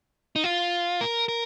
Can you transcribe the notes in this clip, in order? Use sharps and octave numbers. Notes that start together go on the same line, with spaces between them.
D#4
F4
A#4
A#4